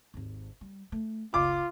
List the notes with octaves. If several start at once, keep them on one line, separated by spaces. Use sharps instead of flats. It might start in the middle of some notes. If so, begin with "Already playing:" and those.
G#1 D#2
G3
A3
F#1 C#2 F4 D6